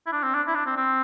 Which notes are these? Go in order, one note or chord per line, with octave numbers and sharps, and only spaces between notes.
E4
D4
C4
D4
E4
D4
C4
C4